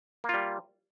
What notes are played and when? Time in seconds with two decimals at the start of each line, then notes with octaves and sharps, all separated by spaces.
0.24 A#3
0.29 F4
0.34 G3